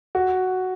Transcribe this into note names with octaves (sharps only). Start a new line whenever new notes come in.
F#4